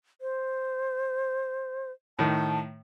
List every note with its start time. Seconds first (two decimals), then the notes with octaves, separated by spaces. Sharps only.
0.21 C5
2.19 A2 D#3 A5